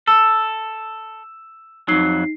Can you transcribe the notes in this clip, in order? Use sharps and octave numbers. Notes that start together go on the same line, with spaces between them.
A4 E6 E7
F2 F#3 D#4 C7